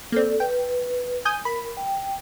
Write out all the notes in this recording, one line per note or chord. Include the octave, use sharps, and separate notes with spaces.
A#3 C4 A4 D5
B4 G5
G#5 D#6 G6
A#4 B5
G5